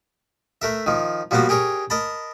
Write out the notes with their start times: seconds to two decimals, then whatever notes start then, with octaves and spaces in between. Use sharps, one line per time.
0.62 A3 A#4 E5
0.86 D#3 F3
1.31 F3 G3 A#3 B3 F#4
1.49 G4 G#4 A#4 C#5
1.90 A#4 D#5 A5 B5